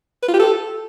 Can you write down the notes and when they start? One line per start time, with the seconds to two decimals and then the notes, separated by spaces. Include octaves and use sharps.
0.23 B4
0.28 F4
0.34 G4
0.39 A4